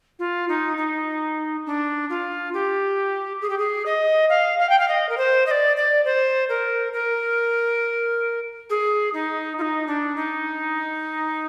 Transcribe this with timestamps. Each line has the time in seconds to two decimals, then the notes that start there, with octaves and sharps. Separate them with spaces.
0.19 F4
0.49 D#4
0.77 D#4
1.66 D4
2.10 F4
2.54 G4
3.42 G#4
3.50 G4
3.59 G#4
3.86 D#5
4.29 F5
4.59 F5
4.69 G5
4.79 F5
4.88 D#5
5.09 A#4
5.18 C5
5.46 D#5
5.51 D5
5.77 D5
6.05 C5
6.49 A#4
6.93 A#4
8.70 G#4
9.14 D#4
9.58 F4
9.62 D#4
9.87 D4
10.16 D#4